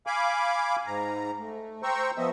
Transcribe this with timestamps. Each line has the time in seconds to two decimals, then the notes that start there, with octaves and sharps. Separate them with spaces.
0.07 F5 G#5 B5 D6
0.86 G#2 A#5
1.39 A3
1.83 C5 G5 A#5 C#6 E6
2.18 F3 B3 D#5 E5